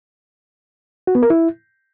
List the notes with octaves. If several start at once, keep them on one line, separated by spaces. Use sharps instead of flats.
F#4
B3
A#4
E4